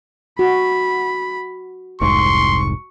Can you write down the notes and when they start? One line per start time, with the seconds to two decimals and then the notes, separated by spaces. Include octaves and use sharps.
0.39 F#4 B5
2.01 F1 C2 G#2 C6 C#6